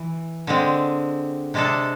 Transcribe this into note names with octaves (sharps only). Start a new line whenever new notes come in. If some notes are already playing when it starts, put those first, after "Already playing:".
Already playing: E3
D3 G#3 C4
C3 G#3 D4 A4